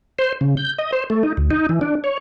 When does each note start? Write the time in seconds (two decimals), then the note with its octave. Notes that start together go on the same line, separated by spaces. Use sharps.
0.19 C5
0.41 C#3
0.57 G6
0.78 D#5
0.93 C5
1.10 A3
1.23 D#4
1.37 D2
1.51 D#4
1.69 E3
1.81 D4
2.04 C#5